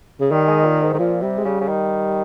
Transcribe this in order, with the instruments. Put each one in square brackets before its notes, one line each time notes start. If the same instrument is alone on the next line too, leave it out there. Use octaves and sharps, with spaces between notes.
[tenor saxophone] C#3
[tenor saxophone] D#3 [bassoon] G3
[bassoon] G#3
A#2
G#2
[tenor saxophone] D#3
[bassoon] A#2 [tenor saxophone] F3
[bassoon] C3 [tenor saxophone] G3
[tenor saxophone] G#3
[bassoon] C#3 [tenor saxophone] G3
[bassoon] C#3
D#3